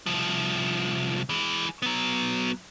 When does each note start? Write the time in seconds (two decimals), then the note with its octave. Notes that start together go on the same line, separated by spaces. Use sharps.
0.06 C2 F3
1.29 E3 G#3
1.82 F#3 B3